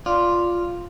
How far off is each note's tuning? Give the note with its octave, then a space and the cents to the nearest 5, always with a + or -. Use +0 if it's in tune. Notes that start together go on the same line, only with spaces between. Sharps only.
F4 +0 D5 +0